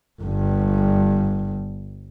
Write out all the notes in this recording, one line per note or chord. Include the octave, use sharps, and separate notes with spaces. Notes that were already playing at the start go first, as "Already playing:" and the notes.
G1 G2